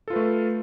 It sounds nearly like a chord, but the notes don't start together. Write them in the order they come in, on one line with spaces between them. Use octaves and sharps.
A4 F4 B4 A3